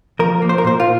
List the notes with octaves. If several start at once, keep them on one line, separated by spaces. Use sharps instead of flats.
F3 A#4
A#3
C5
A#4
A#2 C5
F4